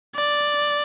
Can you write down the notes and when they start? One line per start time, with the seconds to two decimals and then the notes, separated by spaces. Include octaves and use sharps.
0.16 D5